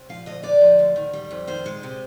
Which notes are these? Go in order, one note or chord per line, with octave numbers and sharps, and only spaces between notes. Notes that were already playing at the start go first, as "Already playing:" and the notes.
Already playing: C3
F3 F5
D2 D#5
D3 D5
F3
D2
D#3
G3
F2
D#3 C5
G#3
C3